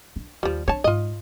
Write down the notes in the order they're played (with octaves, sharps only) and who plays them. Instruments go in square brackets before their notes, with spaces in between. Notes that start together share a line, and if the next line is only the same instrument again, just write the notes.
[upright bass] D4
[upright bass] D#2 [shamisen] F3 G3
[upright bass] C4 D4 [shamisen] C#5 A5
[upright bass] G#2 [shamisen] F4 D#5